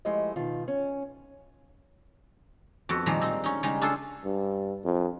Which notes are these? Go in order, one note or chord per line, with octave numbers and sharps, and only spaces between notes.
F3 G#3 A3 E4 G4 D#5
B2 D#3 F4
C#4
F2 B3 F#4 A4
A#2 D#3 F3 G3 G#3 A#3
C4 D#4
C#4 D#4
C#3 G3 G#3 D#4 G#4
D4 F4 G#4 A4 C5
G2
F2